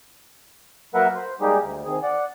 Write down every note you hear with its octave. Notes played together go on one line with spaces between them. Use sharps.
F#3 A#3 A#4 B4 E5 F#5
C5
G3 G#3 A#3 D#4 G4 G#4
D2
C3 D#3 G#4
D5 F#5